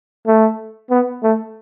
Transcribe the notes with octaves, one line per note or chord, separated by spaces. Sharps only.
A3
B3
A3